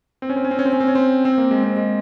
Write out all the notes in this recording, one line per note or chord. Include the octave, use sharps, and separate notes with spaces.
C4
C#4
C4
C#4
C4
C#4
C4
C#4
C4
C#4
C4
C4
A#3
G#3
C4
G#3